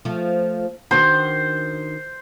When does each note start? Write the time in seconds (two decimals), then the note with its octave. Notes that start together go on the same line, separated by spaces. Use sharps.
0.05 F3 A3
0.91 D#3 D4 F#4 C5